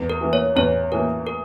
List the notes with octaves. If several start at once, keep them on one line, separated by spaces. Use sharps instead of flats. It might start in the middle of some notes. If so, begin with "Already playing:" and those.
Already playing: E2
A#4
E3 A#3
C#5
E2 C#5
E3 A#3 A#4
A#4